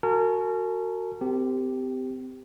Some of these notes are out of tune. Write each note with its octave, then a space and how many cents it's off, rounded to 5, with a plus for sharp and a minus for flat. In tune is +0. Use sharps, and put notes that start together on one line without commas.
F#4 +0 A#4 -35 G#5 +45
C4 -35 G4 +0